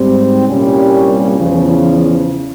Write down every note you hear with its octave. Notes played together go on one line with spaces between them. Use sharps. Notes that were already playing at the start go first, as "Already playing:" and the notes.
Already playing: G#2 G3 C4
C2 A#2 G3 C#4
E2 C#3 F3